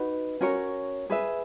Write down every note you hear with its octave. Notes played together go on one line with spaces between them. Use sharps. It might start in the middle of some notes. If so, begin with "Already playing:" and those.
Already playing: D#4 F#4 B4 F#5
C#4 F#4 A#4 C#5
G#4 B4 E5